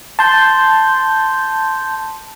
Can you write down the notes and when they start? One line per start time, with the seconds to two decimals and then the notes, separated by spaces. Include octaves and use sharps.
0.19 A5 C6 G6